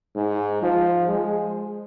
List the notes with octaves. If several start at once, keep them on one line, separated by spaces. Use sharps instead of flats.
G#2
F3
G#3